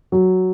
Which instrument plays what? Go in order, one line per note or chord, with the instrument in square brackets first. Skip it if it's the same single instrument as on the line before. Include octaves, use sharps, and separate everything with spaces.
[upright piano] F#3